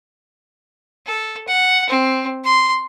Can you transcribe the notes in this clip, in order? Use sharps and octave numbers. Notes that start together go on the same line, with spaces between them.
A4
F#5
C4
C6